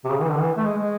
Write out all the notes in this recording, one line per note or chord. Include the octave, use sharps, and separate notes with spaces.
C3
C#3
E3
D3
E3
A3
G#3
G#3